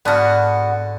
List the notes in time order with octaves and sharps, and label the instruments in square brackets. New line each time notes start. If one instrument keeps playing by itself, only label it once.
[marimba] G#2 A5 F6 [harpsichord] D3 [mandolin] B3 F#4